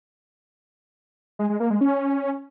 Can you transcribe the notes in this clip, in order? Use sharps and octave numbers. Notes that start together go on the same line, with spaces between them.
G#3
G#3
A#3
G#3
C#4